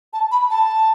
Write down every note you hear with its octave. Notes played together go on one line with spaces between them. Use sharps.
A5
B5
A5